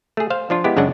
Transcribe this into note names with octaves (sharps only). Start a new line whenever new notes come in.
A3 G#4
C5 F5
F3 D4 F4
G#3 B3 E4 G4
F#2 C#3 F#3 G#3 D4 F#5